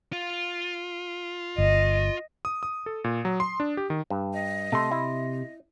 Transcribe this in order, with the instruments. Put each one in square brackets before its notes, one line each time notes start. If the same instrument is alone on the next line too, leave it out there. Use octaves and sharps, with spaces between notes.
[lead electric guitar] F4
[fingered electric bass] G1 [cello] D#5
[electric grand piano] D#6
D#6
A4
A#2
F#3
C6
D4
G4
D#3
[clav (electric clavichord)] G2
[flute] D#5
[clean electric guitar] C3 C6 [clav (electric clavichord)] A3
[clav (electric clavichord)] E4